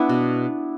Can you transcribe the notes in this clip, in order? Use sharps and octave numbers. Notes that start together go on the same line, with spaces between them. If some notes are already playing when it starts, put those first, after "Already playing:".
Already playing: B3 D4 E4
B2